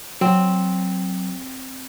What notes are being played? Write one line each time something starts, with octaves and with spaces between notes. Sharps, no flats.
F#3 C4